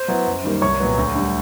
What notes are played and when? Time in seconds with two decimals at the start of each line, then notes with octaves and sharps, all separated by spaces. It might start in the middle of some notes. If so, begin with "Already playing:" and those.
Already playing: C5
0.08 F#3 B3 E4
0.27 F#2
0.44 D#3 G3 A#3
0.62 C2 C#5 C#6
0.80 A#2 F#3 B3
0.97 D2
1.15 D3 G3